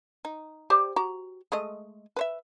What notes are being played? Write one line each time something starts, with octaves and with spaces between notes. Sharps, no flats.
D#4
G4 C5 D5
F#4 A#5
G#3 A3 D#5
B4 C5 E5